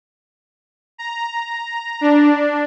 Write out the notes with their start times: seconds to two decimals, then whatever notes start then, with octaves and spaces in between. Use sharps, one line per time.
0.98 A#5
2.01 D4